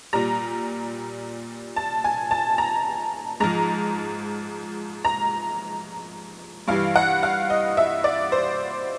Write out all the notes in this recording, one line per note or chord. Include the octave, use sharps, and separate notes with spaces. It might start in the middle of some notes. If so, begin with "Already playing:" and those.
A#2 G3 A#5
A5
G#5
A5
A#5
G#2 F3 A#5
A#5
G2 E3 G3 F5
F#5
F5
D#5
E5
D5
C5